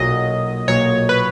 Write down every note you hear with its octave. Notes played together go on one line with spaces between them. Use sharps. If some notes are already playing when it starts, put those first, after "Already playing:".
Already playing: B1 A#2 F#3 D#5
B1 A#2 F#3 C#5
B4